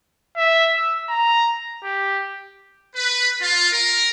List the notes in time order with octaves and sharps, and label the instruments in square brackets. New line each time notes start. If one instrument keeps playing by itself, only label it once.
[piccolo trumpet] E5
E6
A#5
G4
[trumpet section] B4
F4
A#4